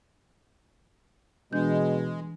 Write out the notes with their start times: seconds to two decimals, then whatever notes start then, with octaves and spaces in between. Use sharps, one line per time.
1.53 B2 E3 G#3 D4 G6